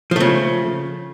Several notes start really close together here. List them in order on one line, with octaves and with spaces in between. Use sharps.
F3 A3 C#3